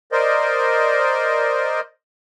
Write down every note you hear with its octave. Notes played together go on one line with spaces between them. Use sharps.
A#4 C5 D5 D#5